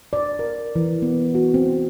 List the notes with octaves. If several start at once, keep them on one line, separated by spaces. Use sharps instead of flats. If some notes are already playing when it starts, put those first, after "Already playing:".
D5
A#4
E3
B3
F#4
C4